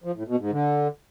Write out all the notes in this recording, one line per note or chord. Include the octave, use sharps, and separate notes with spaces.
F3
A2
B2
G#2
D3